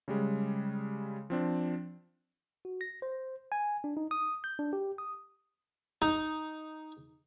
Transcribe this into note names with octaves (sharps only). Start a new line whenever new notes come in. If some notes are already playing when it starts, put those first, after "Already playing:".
C#3 G3 G#3
F3 C4 D4
F#4
A#6
C5
G#5
D4
D#4
D#6
G6
D4
G4
D#6
D#4